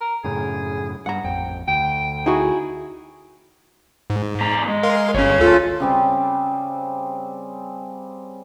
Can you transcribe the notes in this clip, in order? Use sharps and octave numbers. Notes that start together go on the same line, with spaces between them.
A#4
F#2 A2 C#3 G#4
G2 F#5 A#5
A1 F2 G5
D2 G5
D#4 E4 F#4 G#4
G#2
E2 A#5
G#3
A#4 F5 C6
G1 C#4 G#4 C#5
D2 F4 A4
C#3 G3 C4